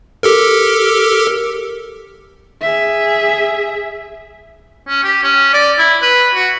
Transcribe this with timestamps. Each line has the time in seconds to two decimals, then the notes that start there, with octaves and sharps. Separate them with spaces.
0.23 G4 A4 A#4
2.62 G#4 E5
4.88 C#4
5.04 G4
5.23 C#4
5.53 D5
5.78 E4
6.02 B4
6.35 F#4